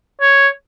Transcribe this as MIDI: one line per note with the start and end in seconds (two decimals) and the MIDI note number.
0.21 0.48 73